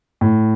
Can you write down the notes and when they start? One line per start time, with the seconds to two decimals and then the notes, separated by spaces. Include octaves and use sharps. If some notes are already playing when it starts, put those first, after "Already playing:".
0.21 A2